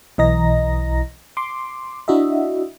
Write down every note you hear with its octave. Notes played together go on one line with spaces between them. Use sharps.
B1 E3 D#5 A#5 A#6
C6 D6
D4 E4 F#4 D#5 E5